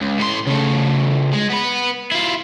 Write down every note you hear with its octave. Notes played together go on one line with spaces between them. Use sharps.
C#2
A2 C6
C#3 A3
G#3
B3 B4
E4 F4